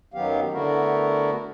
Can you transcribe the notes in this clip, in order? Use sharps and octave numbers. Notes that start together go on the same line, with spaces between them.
F#2 D#3 F#3 B3 G4 F5
D3 A3 B3 E4 F#4 A#4